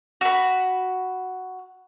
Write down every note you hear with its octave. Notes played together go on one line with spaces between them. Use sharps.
F#4 B5